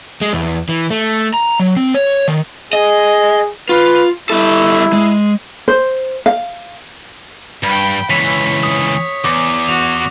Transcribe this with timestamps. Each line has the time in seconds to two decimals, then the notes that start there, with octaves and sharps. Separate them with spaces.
0.21 G#3
0.33 E2
0.69 E3
0.91 A3
1.34 A#5
1.60 F#3
1.77 C4
1.94 C#5
2.28 D#3
2.73 G#4 D#5
3.69 F4 B4
4.30 G3 E4 A4
4.93 G#3
5.68 C5
6.26 F5
7.63 G2 G5 B5
8.10 C#2 E3 C#5 B6 F7
8.63 D#6
9.24 E2 D6
9.68 F#4 F7